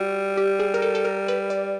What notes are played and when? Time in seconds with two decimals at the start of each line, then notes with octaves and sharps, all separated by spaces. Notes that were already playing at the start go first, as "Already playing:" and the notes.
Already playing: G3 F#4
0.37 G4
0.59 G#4
0.74 A#4
0.82 A4
0.95 A4
1.05 A#4
1.28 B4
1.50 D5